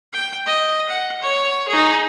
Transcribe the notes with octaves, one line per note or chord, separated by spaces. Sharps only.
G5
D#5
F#5
C#5
D#4 G#4